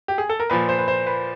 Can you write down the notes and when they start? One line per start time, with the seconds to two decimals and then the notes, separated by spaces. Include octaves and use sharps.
0.08 G4
0.18 G#4
0.29 A4
0.40 A#4
0.50 A#2 F3 B4
0.69 C5
0.79 B4
0.88 C5
1.06 B4